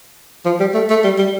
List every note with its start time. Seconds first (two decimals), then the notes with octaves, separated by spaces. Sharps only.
0.45 F3
0.60 G3
0.74 A3
0.90 A3
1.04 G3
1.18 G3